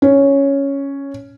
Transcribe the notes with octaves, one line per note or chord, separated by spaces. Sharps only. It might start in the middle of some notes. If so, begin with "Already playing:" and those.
C#4